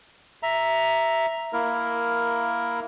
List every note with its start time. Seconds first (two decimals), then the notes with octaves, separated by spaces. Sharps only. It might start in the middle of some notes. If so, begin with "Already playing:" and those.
0.43 E5 A#5
1.53 A#3 E4 A#4